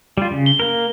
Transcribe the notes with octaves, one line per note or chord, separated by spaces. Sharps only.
G3 F4
C#3
G7
A#3 A#4